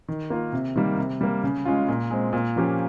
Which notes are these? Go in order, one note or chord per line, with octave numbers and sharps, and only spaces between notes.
D#3
A#3 F4
C3
D#3 G3 A#3
C3
G3 A#3
C#3
G#3 C#4 F4
A#2
G#3 C4
A#2
F3 A#3 C#4 G4